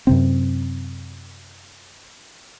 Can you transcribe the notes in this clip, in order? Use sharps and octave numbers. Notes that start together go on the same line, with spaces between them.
F#2 C3 C4